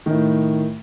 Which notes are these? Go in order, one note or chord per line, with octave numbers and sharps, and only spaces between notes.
A2 D#3